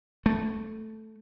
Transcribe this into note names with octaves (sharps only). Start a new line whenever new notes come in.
A3